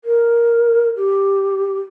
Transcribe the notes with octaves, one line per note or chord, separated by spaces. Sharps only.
A#4
G4